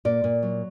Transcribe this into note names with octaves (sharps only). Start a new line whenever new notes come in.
A#2 D5
A#2
F#3